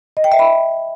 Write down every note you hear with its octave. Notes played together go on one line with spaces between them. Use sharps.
D#5
G5
E5
B5